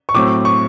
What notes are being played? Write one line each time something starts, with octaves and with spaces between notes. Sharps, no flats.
C#6
A2 F#3 A3 C4 D6
C#6